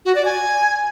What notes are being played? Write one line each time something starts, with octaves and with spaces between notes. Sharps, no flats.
F#4
D5
G#5